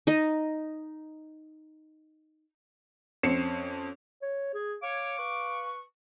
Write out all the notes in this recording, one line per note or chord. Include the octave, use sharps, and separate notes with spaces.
D#4 D#5
F2 C4 C#4 C7 C#7 E7
C#5
G#4
C#5 F5 D6
B4 C#6